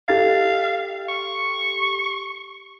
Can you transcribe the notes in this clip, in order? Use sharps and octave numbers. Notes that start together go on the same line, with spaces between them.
G4 A4 F5 A6
C#6